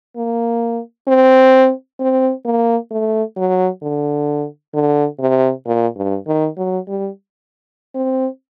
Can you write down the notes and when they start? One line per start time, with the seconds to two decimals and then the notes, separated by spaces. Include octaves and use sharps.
0.17 A#3
1.07 C4
2.00 C4
2.45 A#3
2.91 A3
3.36 F#3
3.82 D3
4.74 D3
5.19 C3
5.66 A#2
5.96 G2
6.27 D#3
6.58 F#3
6.88 G3
7.95 C4